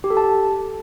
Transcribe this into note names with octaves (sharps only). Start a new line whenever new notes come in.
G4
A4
A5